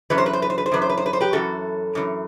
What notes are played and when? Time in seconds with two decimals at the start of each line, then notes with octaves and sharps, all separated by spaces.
0.10 F#2 E3 B4
0.18 C5
0.26 B4
0.33 C5
0.42 B4
0.50 C5
0.58 B4
0.66 C5
0.72 F#2 E3 B4
0.82 C5
0.89 B4
0.97 C5
1.06 B4
1.13 C5
1.21 G4 B4
1.33 F#2 E3 F#4 A4
1.95 F#2 E3